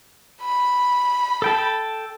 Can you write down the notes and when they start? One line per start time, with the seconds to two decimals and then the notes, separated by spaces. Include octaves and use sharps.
0.41 B5
1.42 A4 G5 A5